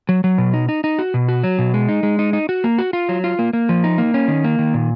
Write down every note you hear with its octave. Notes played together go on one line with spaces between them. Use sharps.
F#3
F#3
B2
D#4
D#4
D#4
F#4
B2
F#4
F#3
B2
G#3
D#4
G#3
D#4
D#4
F#4
A#3
F#4
F4
F#3
F4
A#3
A#3
F3
D#4
A#3
C#4
D#3
A#3
D#3
A#2